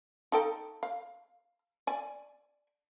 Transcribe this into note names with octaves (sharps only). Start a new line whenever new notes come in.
D#4 A4 G5
F5
D5 G#5